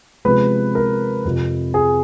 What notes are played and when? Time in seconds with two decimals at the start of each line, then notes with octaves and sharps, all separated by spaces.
0.25 C3 F3 G#3 B3 B4
0.75 A#4
1.25 F2 C3 F3
1.74 G#4